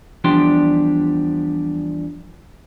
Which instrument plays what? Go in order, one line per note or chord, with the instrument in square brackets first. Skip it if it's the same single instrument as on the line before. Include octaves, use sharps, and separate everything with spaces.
[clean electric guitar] E2 F3 G3 D4 G4 C6